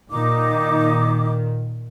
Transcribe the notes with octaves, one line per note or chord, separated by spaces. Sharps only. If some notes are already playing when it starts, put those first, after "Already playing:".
A#2 D#3 D#4 D6